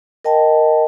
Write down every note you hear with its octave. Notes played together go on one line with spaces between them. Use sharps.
A#4 D#5 G5 A5